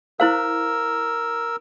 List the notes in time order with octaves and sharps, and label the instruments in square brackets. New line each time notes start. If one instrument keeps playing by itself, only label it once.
[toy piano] E4 C5 F5 [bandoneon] A#4 E6